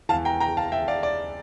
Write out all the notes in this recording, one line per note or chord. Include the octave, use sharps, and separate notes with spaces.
E2 E3 F5 A5
G5 A#5
G5 A#5
F5 A5
E5 G5
D5 F5
D5